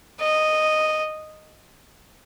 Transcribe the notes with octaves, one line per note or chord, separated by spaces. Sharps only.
D#5